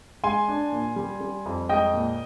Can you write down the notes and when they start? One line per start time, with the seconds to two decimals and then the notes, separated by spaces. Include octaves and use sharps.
0.24 G#3 G#5 C6
0.48 D4
0.72 A#2
0.96 G3
1.21 G3
1.46 F2
1.69 G#3 D#5 G5
1.94 A#2